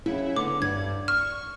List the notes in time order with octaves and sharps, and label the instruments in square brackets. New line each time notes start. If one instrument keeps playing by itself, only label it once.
[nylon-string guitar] F#2 C#3 [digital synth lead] E4
[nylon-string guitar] D3 B3 [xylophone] D6
[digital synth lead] G2 [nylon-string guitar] D5 [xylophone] G#6
[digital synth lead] C#6 [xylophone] F6